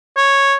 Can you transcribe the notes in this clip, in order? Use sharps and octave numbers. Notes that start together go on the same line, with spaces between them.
C#5